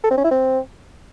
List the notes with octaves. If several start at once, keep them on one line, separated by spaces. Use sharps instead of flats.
A4
C4
C#4
E4
C4